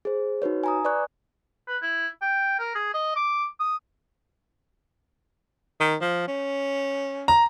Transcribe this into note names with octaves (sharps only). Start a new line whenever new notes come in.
G#4 C5
D#4 F#4 B4 C#5
G#5 A#5 D#6
B4 D5 G#5 C#6 F#6
B4
E4
G5
A#4
G#4
D#5
D6
D#6
D#3
F3
C#4
A#5